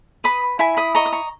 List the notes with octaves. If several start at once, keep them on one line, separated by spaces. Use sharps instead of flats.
B4 B5 D#6
E4 G#5 B5
B5 D#6
D#5 A#5 C#6
D#6
A#5 C#6